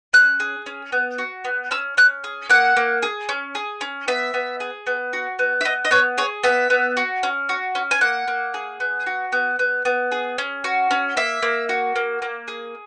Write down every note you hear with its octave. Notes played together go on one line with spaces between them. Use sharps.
C#4 F#6
G#4
C#4
B3
F#4
B3
C#4 E6
C#4 F#6
G#4
A#3 F#5
A#3
G#4
C#4
G#4
C#4
B3 E5
B3
G#4
B3
F#4
B3
E5
B3 D#5
D#5
B3 C#5
G#4 C#5
B3 E5
B3
F#4
C#4
F#4
C#4
G#5
A#3 F#5
A#3
G#4
B3
F#4
B3
B3
B3
G#4
C#4
F#4
C#4
A#3 E5
A#3
F#4
A#3
A#3
G#4